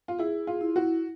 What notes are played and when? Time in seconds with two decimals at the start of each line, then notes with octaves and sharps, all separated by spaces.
0.08 F4
0.19 E4 G#4
0.47 F4
0.61 E4
0.76 F#4